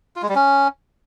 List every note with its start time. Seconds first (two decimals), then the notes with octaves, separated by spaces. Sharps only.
0.16 F4
0.22 G#3
0.29 G3
0.35 C#4